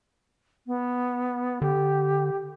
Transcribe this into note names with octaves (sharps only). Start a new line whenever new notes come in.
B3
D3 G4